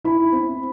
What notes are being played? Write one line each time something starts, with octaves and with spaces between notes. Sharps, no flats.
E4 B5
C4